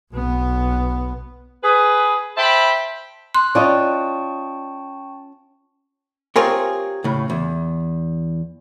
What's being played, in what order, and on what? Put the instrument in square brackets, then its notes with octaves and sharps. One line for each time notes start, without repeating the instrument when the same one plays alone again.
[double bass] B1 B3
[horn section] G#4 B4
C5 E5 G5 A5 B5
[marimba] C6 [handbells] F#6
[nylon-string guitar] C#4 F4 [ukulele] D5 D#5 [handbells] G5 A5 C#6
[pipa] C4 F4 G#4 [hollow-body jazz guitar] G4 A#4 C#5
[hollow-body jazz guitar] A2 C#3
E2